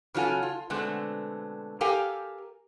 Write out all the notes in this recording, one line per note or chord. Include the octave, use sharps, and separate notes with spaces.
C#3 F#3 F4 A4 G#5
F4
B2 D3 G#3 A3 C4
G4 A4 A#4 F5 G5 G#5